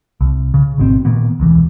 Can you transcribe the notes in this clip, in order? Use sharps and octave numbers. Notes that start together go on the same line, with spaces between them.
C2
C#3
G#1 B2 C4
A#2 D#3 A#3 B3
E1 C#2 E3